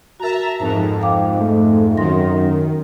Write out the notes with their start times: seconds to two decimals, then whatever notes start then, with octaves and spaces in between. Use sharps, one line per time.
0.20 F#4 A#4 E5 A5 A#5
0.60 F2 G#2 A5
1.02 F5 G5 D6
1.38 A3
1.97 F#2 D#3 C6 A#6